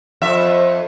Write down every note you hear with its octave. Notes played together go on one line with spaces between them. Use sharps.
F2 E5